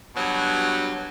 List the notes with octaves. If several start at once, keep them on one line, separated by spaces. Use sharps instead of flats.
G2 B2 F#3